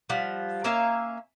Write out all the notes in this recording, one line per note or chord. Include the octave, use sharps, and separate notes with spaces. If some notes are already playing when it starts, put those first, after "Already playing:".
F3 G3 F#5
A#3 C#4 E5 F5